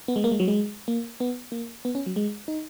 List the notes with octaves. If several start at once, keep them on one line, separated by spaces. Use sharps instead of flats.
B3
G#3
A#3
G#3
F#3
G#3
A#3
B3
A#3
B3
C#4
F#3
G#3
D#4